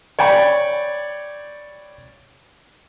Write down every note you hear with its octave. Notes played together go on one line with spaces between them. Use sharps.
C#5 D5 G5 B5